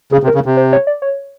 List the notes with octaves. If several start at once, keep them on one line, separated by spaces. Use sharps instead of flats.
C#3 G#4
C3
A#4
C#3
C3
C5
C#5
D5
C#5